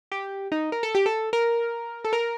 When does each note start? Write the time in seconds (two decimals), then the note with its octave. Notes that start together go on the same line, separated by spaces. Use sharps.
0.12 G4
0.52 D#4
0.72 A#4
0.83 A4
0.95 G4
1.06 A4
1.33 A#4
2.05 A4
2.13 A#4